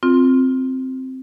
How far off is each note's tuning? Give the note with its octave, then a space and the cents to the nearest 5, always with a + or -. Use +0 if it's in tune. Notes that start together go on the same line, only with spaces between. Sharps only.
C4 +0 F4 +5